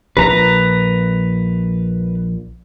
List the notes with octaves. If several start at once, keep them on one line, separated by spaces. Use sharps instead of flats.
A#1 A#2 B4 A#5